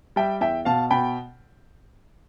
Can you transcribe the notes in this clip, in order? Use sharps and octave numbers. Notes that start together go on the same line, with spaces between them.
G3 E5 G5
E2 E5 G5
B2 F5 A5
B2 G5 B5